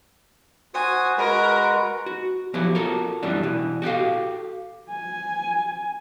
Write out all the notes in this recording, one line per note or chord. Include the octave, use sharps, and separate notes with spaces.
F#4 C5 G#5 D#6
G#3 F#4 A#4 B4
F#4
F3 F#3 B3 E4 F#4 G4
F4 F#4 A4 A#4
F#2 E3 F#3 G3 B3 D4
B2 E3
F#4 G4 A4 F5
G#5